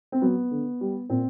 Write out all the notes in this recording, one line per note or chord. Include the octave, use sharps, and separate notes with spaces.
C4
F#3 B3
D3
G3
A#2 C4